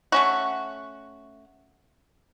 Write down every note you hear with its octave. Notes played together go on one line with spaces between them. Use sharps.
A3 C#4 F#4